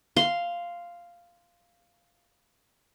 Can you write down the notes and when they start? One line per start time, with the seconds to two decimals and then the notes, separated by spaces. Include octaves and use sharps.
0.16 F5 C6